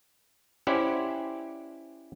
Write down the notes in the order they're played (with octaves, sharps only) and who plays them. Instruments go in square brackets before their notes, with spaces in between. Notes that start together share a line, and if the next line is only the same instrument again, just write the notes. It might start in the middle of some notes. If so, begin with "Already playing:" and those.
[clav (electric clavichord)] C#4 E4 G4 C5 D5 F#5